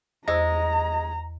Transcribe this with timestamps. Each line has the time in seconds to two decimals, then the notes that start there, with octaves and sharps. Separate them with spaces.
0.28 E2 G#3 C5 D#5 A#5 E6 A#6